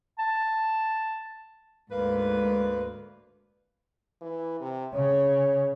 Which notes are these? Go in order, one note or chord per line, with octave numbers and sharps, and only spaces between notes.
A5
D2 G#2 A#3 B4
E3
C3
C#3 C#5